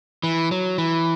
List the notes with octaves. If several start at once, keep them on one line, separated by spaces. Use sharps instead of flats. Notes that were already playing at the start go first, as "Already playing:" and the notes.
E3
F#3
E3